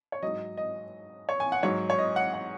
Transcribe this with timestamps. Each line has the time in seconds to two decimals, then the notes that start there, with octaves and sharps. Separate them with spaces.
0.12 C#5
0.22 G#2 F#3 D#5
0.57 D#5
1.29 C#5
1.40 G#5
1.52 F#5
1.63 G#2 F#3 C#5
1.90 C#5
1.98 D#5
2.16 F#5
2.34 F#5